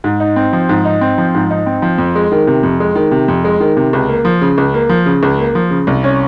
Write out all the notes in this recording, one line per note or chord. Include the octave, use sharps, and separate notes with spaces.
G#2
D#4
C4
F3
G#2
D#4
C4
F3
G#2
D#4
C4
F3
F2
G#3
D#3
C3
F2
G#3
D#3
C3
F2
G#3
D#3
C3
C#2
A#3
F3
C#3
C#2
A#3
F3
C#3
C#2
A#3
F3
C#3
C2
C#4